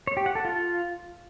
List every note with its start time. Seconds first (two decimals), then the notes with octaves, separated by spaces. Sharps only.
0.07 C#5
0.17 G4
0.26 F#5
0.35 A4
0.45 F4